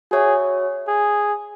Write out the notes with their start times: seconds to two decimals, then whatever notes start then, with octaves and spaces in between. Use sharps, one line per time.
0.11 F#4 G#4 C#5 E5 G#5
0.87 G#4